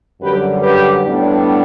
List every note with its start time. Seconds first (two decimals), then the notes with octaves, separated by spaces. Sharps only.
0.21 F#2 D3 G3 G4 B4
0.61 G4 B4
1.01 A2 G3 B3 D4